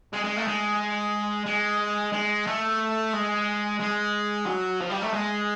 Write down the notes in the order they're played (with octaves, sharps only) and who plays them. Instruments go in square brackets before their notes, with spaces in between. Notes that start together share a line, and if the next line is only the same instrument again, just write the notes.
[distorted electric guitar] G#3
G#3
A3
G#3
G#3
G#3
A3
G#3
G#3
F#3
F3
G3
A3
G#3